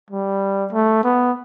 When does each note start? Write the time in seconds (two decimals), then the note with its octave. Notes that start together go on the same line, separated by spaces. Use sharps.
0.11 G3
0.73 A3
1.04 B3